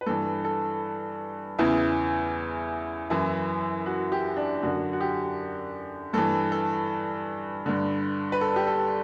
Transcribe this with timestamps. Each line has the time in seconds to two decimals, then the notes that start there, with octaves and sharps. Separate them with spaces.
0.01 B4
0.06 G2 E3 A4
0.45 A4
1.58 E2 C#3 E3 E4
3.10 F#2 E3 E4
3.86 F#4
4.12 G4
4.36 D4
4.62 F#2 D3 F#4
4.93 F#4
5.00 G4
6.13 G2 E3 A4
6.52 A4
7.66 G2 D3
8.32 B4
8.41 A4
8.56 G4
8.67 A4